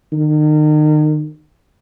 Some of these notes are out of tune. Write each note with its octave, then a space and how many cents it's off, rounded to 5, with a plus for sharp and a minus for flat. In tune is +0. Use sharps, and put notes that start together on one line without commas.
D#3 -35